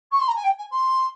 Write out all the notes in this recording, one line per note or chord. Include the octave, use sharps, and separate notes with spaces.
C#6
C6
A#5
G#5
G5
G#5
C6